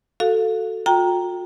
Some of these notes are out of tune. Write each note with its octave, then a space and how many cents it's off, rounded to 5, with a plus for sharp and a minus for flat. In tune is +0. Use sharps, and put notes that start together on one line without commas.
F#4 +0 A4 +5 F5 +20
F4 +45 G5 -5 A#5 +0